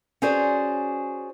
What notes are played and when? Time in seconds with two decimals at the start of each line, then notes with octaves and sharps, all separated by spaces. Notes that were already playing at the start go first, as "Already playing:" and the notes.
0.22 C#4 F#4 G#4 C5 D5